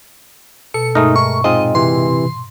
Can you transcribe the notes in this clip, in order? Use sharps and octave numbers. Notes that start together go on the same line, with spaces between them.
B2 A4 C#7
G2 B2 G#3 A3 D#4 A#4
C#6
A#2 G#3 C4 D#4 F4 D#5
C3 E3 C6